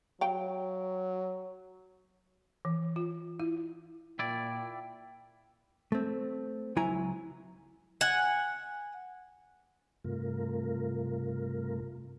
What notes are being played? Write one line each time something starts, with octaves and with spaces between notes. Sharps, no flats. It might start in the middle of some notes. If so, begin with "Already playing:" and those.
F#3 F5 G5
E3
F4
E4
A#2 E4 D5 G5
A3 C4
C#2 F#3 E4 G#5 A#5
F#5 G#5
G2 C3 A3 F4 A#4